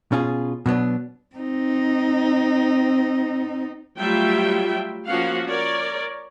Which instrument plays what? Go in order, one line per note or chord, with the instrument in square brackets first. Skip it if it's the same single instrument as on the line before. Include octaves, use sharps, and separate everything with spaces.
[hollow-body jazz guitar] B2 C#4 F4 G#4
B2 F#3 B3 D4
[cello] C4 D#4
[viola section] F#3 G3 A3 F4 E5 G5
F3 A#3 C#4 F#4 F5 F#5
A#4 C#5 D5